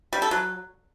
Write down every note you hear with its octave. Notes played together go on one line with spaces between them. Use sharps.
G3
A4
F#3